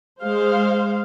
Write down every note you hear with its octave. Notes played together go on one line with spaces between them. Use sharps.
G#3 C5 F5